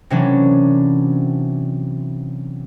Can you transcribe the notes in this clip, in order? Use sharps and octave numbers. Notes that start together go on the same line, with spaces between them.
C3 E3 F#3 A#3 C#4 D4